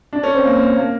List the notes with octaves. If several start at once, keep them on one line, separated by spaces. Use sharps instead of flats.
D4
C#4
C4
A#3
A#3
A#3